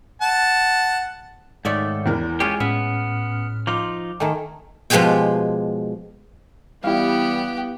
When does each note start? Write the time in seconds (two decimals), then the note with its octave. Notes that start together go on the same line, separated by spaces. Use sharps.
0.22 F#5 A5
1.65 G#2 D#3 A3 C#5 D5 E5
2.06 E2 E3 A#4
2.40 G#3 C#4 F4 G4 G#4
2.60 A2 B3 C#4 E5 F6
3.67 F3 D#4 F4 D6
4.20 D#3 A3 G5 G#5 A#5
4.90 B2 F3 G#3 G4 G#4 G5
6.84 E3 G3 B3 E4 G4 F5